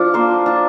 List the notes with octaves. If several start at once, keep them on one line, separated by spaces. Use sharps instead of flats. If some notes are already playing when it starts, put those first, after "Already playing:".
Already playing: F3 D4 F4
A#3 C5
D4 F4